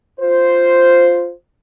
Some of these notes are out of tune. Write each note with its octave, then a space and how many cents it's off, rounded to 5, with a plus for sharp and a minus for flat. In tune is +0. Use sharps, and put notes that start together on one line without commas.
F4 +0 C5 -5